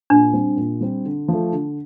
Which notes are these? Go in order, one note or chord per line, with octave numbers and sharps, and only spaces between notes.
A#2 D4
G3 C4
A#2
G3 C4
D3
F3 A3
D3